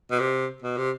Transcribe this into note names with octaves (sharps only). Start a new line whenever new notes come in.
B2
C3
B2
C3